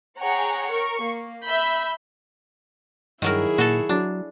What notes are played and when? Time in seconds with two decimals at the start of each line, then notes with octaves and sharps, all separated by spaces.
0.19 G#4 C#5 F#5 G5 A#5
0.72 A#4 C#6
1.02 A#3
1.43 E5 B5 G6
3.22 G2 D#3 F#3 E4 G#4 A#4
3.58 A#2 F#4 A4
3.89 F#3 D4